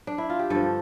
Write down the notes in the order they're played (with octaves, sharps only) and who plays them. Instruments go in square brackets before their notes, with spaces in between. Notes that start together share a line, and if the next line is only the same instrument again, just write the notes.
[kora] D4
E4
F4
G4
G2 D3 F3 A4